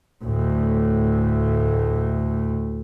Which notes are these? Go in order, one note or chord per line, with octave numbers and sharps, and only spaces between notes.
D2 A2